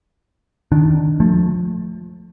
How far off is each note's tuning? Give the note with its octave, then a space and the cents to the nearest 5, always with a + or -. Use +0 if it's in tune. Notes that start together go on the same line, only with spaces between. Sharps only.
D#3 +0 D4 +0
F3 +25 A3 +0